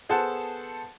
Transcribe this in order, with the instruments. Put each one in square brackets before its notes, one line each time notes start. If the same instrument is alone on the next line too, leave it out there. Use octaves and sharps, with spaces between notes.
[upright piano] B3 G#4 A4 C5 F#5 A5